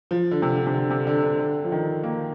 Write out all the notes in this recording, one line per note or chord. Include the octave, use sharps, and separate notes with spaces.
F3
D3
C3
D3
C3
D3
C3
D3
D3
D3
F3
D#3
A#3